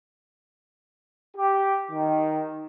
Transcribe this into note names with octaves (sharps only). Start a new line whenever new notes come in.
G4
D#3